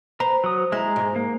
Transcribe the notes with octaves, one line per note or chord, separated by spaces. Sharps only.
B4 C5 A#5
F#3 D#6
G#3 E4 A#5
G#2
A#3